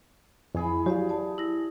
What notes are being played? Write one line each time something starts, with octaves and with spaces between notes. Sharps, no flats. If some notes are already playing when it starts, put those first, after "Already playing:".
F2 E3 G#4 B5
F#3 G4 D5 F5
D5 A5
E4 A#6